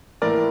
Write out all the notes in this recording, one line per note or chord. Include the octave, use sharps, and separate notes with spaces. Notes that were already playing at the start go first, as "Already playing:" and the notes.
A2 E3 A#3 A#4 D5